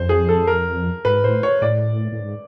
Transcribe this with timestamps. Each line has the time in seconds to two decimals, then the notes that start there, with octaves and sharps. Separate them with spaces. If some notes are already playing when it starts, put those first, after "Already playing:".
Already playing: F2 C5
0.09 G#4
0.29 A4
0.47 A#4
1.05 G#2 B4
1.24 A2 C5
1.43 C#5
1.62 A2 D5
2.12 A2
2.20 G#2